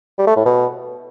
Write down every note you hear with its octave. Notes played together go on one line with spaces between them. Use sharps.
G3
A3
A2
B2